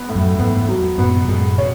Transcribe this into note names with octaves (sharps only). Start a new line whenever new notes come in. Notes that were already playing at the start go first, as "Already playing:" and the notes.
Already playing: B3
A2
F#2
E2 G#2 B3
F#3
F#2 A2 B3
B2
F#2 A2 G#3
B2 C#5